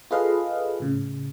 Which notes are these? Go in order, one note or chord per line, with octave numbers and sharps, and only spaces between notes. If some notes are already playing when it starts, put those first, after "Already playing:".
F4 G#4 A4 B4 D#5 F5
A2 C#3